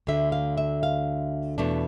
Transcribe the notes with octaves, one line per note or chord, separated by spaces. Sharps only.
D2 D3 A3 E5
F5
E5
F5
E2 B2 A3 D4